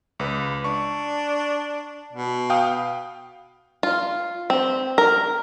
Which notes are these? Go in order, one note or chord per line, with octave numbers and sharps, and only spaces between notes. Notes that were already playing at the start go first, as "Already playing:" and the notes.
C#2 B4
D4 C#6
B2
F5 G5 D#6
F4
C4
A#4